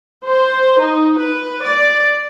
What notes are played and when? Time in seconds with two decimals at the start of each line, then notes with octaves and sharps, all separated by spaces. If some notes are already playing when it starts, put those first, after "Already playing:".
0.23 C5
0.78 D#4
1.19 B4
1.65 D5